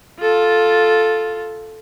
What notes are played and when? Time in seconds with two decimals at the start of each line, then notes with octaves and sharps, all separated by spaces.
0.21 F4 A4